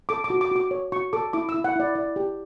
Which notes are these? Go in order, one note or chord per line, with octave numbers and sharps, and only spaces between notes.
A4 D6
D6
F#4
D6
F#4 D6
C#5
F#4 C#6
A4 D6
E4 D6
E6
E4
F#5
E4 D5
E4 D5
G4